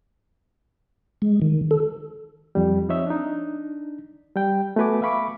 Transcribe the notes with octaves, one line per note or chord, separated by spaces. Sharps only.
G#3
D#3
A4
F2 G3
F3 C4 D#4 C#5 D#5 E5
D4 D#4
G3 G5
A3 B3 F#4 B4 G#5 D6
E5 F5 B5 C#6 D6